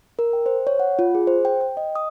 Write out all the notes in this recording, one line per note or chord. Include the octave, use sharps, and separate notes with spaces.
A#4
G5
C5
C#5
F#5
F4
G#4
C5
G5
G5
D#5
D#6